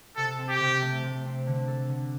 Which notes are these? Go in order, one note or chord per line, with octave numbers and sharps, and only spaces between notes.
C3 A4
C4
G4
C3
A3
C3
C4
D3
A4
D3